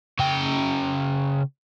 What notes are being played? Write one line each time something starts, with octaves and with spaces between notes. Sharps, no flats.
C#3 G5